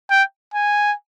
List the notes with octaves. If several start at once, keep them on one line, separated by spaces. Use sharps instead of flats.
G5
G#5